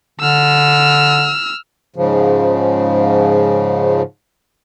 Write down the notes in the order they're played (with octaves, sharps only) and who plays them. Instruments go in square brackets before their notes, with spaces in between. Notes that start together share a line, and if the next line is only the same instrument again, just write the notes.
[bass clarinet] D3 [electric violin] E6 F6
[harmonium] G#2 C#3 F3